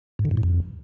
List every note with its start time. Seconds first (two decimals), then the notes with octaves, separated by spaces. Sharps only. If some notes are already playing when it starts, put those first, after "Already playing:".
0.19 G#2
0.25 D3
0.31 G2
0.37 A2
0.43 F2